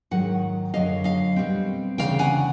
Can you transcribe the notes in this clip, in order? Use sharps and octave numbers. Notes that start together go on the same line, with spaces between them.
G#2 D#3 F#3 F#5
F#2 D3 F#3 D#5 F5
D#5 F5
B2 G3 C4
D2 C#3 E3 F5 G5
F#5 G#5